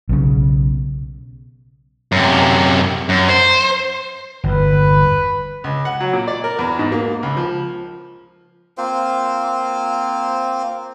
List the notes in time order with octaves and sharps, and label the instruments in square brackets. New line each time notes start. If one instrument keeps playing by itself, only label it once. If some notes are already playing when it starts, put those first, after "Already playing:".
[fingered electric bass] B1 C#3
[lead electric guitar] F#2 C3
F#2
C5
[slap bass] G1 E2 [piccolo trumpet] B4
[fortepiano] C#2
F#5
F#3
A#2
D5
A#4
E2
G#2
A#3
C#2
F3
[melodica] A#3 C4 F4 C5